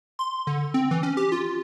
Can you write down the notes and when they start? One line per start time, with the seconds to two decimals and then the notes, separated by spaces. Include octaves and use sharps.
0.19 C6
0.47 D3
0.74 C4
0.91 E3
1.03 C#4
1.17 G4
1.32 F4